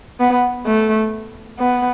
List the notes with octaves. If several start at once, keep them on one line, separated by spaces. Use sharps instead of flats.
B3
A3
B3